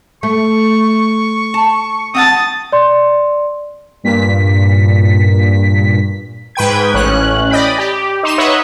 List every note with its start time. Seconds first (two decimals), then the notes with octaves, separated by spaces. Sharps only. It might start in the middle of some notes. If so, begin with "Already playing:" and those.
0.23 A3 C#6
1.54 A5
2.15 C4 F#5 A5 D#6 A6
2.72 D5 C6
4.04 G2 A#2 B6
6.55 G#2 B4 G5 G#6
6.94 A1 C#4 F#6
7.51 D5 D#5 G5 B5
7.78 G4
8.23 D#4 C6 E7
8.38 B4 C#5 D#5 E5 F#5